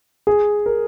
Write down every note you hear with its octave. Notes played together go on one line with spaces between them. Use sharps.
G#4
A#4